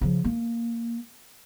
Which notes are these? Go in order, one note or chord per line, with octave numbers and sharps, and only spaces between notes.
C#3 F3
A#3